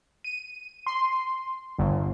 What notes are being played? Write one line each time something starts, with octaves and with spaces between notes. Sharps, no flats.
D#7
C6
G1